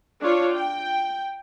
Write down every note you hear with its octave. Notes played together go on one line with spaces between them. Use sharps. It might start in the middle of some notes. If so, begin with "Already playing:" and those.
D4 F4 C#5
G5